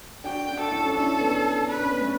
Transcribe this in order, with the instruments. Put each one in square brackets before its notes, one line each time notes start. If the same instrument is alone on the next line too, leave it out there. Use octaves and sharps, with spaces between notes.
[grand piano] D4 F#4 [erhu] G5
[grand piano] D4 F#4
[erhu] A4
[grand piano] E4
D4 F#4
C#4
D4
[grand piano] C#4 E4 [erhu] A4
[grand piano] B3 D4
[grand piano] D4 [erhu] B4
[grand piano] C#4
B3
A3 C#4